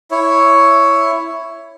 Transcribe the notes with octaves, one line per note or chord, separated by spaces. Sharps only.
E4 C#5